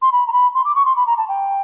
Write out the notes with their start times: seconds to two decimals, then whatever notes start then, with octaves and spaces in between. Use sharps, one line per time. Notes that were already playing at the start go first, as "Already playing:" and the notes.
0.02 C6
0.12 B5
0.27 A#5
0.33 B5
0.55 C6
0.65 D6
0.76 C#6
0.86 C6
0.96 B5
1.07 A#5
1.18 A5
1.28 G5